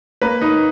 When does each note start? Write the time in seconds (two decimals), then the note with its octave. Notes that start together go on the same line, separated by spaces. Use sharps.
0.22 A#3 B4
0.42 D#4